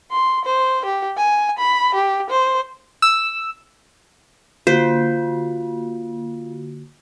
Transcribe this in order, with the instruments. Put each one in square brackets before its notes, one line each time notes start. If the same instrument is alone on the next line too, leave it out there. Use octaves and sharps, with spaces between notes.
[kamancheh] C6
C5
G4
G#5
B5
G4
C5
[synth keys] E6
[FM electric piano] D3 A#3 F#4 [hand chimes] F4 [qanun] C5